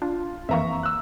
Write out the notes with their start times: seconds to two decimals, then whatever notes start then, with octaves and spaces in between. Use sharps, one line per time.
0.02 D4 F4
0.49 F2 E3 A#3 E5 A#5 C#6
0.83 E6 F#6